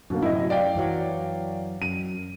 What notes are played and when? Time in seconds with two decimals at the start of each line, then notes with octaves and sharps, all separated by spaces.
0.10 F#2 B2 D3 A#3
0.23 F#2 A2 C3 E4 D#5
0.50 D5 F5 G5
0.75 F#2 E3 F#3
1.82 F#2 D#7